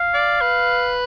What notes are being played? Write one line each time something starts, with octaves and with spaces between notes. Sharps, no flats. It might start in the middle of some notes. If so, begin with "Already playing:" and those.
Already playing: F5
D5
B4